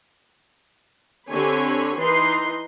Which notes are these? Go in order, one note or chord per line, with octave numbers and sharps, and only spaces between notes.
D3 C4 G4 C#5 G#5 B5
E3 D#4 B4 C6